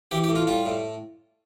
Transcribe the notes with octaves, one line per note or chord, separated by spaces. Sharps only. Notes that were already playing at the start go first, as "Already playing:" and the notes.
E3 G4
G4
A2
F4
G3 F4
A2